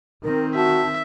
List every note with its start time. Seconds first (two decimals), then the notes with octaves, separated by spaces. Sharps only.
0.23 D#3 C4 A#4
0.55 F#4 E5 A5